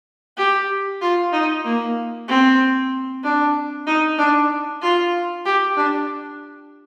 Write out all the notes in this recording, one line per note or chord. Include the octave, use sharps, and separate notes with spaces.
G4
F4
D#4
A#3
C4
D4
D#4
D4
F4
G4
D4